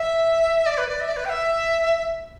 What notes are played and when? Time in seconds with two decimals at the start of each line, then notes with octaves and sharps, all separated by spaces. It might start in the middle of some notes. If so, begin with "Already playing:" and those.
Already playing: E5
0.65 D5
0.77 B4
0.88 D5
1.00 E5
1.08 D5
1.16 B4
1.24 G5
1.29 E5